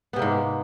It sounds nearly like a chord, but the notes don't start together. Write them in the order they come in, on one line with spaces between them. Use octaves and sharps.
B3 C3 A#3 G#2